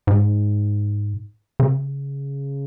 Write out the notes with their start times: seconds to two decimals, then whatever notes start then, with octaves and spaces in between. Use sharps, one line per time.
0.07 G#2
1.60 C#3